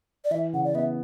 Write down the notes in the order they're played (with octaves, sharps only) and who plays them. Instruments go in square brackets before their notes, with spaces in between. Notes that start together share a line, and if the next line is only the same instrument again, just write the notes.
[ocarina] D5
[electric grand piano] E3 [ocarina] E5
[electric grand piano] C#3 [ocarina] F#5
[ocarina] D5
[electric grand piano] B3 [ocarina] E5